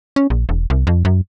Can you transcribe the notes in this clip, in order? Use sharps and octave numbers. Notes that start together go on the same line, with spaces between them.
C#4
A#1
E1
C2
F2
F#2